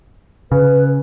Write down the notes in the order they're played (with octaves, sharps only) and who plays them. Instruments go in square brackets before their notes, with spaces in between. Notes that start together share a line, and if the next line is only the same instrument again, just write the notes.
[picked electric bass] C#3 [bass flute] B4